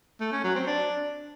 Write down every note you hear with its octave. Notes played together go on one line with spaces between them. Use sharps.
A3
C#4
F#3
C4
D4